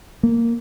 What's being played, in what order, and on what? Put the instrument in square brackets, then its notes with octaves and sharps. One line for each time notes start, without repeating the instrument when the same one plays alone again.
[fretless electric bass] A#3